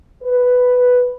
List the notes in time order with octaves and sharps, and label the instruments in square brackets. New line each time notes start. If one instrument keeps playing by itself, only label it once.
[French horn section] B4